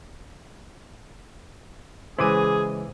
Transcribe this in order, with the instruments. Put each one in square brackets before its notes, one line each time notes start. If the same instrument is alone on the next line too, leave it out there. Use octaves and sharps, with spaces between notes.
[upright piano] C#3 G#3 [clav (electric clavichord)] E3 E4 [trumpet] G#4 [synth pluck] C5 D6 D#7